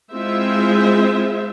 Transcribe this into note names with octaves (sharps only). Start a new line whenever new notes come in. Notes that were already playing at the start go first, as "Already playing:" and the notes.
G#3 C4 E4 F4 C5 E5